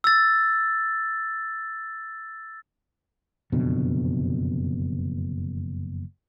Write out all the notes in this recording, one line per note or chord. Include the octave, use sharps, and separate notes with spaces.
E6 A6
F#1 F2 B2 D3